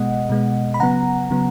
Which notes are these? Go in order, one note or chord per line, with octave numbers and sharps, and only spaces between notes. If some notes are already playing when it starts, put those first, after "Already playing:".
Already playing: B2 G#3 B3 D#5 F#5
B2 G#3 B3
B5
C#3 F#3 B3 F#5 A#5
C#3 F#3 B3